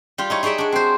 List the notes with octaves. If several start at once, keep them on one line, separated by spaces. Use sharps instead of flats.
G3 F4 G4
D#4 E4 C#5
D#4 G#4 C#5 D5 E5
D4 F#4
C4 C5